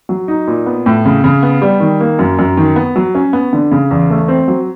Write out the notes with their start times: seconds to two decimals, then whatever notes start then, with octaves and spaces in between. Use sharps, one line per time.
0.09 F#3
0.28 D#4
0.47 A#2
0.66 B3
0.86 A2
1.05 C#3
1.24 C#3
1.43 B3
1.62 G3
1.80 D#3
2.00 A#3
2.19 F#2
2.39 F#2
2.57 D#3
2.76 B3
2.96 F#3
3.15 C#4
3.33 B3
3.53 D3
3.71 C#3
3.91 E2
4.10 A3
4.28 C4
4.48 F#3